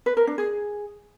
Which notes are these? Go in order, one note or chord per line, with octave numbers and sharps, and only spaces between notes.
B4
A#4
D4
G#4